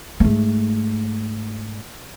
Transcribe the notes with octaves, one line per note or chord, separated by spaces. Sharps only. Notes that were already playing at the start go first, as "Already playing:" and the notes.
G#2 A3